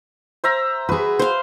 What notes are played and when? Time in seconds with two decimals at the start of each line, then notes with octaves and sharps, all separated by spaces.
0.44 C5 E5 A#5
0.89 F#4 G#4 B4
1.19 C5 F5